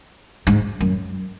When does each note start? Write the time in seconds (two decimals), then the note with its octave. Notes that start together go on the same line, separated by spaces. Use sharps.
0.47 G#2
0.80 F#2